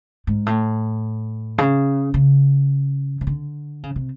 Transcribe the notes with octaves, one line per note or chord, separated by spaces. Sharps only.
G#2
A2
C#3
C#3
C#3
D3
C#3
C3